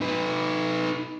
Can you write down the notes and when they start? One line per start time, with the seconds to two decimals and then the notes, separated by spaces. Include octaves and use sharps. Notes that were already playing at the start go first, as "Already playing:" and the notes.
0.01 D#4 B4